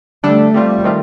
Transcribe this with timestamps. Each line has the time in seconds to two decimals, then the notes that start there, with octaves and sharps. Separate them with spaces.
0.24 D3 G3 A3 D4 A4
0.54 G3 A3 C4 F4
0.84 D#3 A3 C4 F4